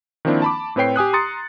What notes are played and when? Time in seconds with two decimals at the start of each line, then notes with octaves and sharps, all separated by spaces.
0.25 D#3 F3 A#3 C4 D4 E4
0.42 A5 B5 D6
0.76 A2 C4 B4 C#5 G5 C7
0.96 G4 G#5 D#6 F#6
1.13 A#5 C6 D#6 A6 C#7